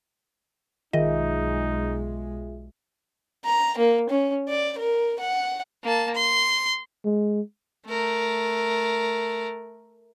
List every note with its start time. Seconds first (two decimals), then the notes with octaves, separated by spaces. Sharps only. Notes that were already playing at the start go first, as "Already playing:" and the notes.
0.93 B1 D#3 G#3 D#4 F4 G#4 D#5 E5
3.45 A#5
3.78 A#3
4.09 C#4
4.48 D5
4.78 A#4
5.20 F#5
5.83 A#3 A5
6.14 C6
7.05 G#3
7.86 A3 A#4